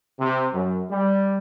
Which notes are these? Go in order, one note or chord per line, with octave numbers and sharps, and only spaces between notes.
C3
F#2
G3